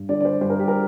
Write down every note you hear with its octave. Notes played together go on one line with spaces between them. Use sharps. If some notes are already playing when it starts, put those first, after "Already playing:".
Already playing: G2
D3 G3 D4 D5
D5
C5
G2 C5
A#4
G4
A#4